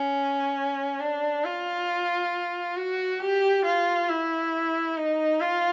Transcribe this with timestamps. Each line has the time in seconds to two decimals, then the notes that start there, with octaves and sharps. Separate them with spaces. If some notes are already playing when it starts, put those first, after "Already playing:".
Already playing: C#4
1.00 D4
1.44 F4
2.76 F#4
3.20 G4
3.65 F4
4.09 E4
4.96 D#4
5.41 F4